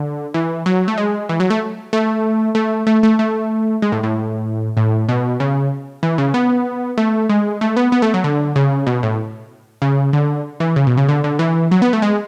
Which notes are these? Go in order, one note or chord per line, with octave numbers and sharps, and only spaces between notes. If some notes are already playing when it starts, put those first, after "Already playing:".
Already playing: D3
E3
F#3
A3
G#3
E3
F#3
A3
A3
A3
A3
A3
A3
G#3
A2
A2
A2
B2
C#3
E3
C#3
B3
A3
G#3
A3
B3
B3
A3
F#3
D3
C#3
B2
A2
C#3
D3
E3
C#3
B2
C#3
D3
D3
E3
F#3
B3
A3
G#3